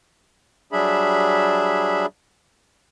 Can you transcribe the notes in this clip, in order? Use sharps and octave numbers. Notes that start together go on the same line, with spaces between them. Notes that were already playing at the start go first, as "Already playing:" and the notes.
F#3 G3 D4 G#4 E5 B5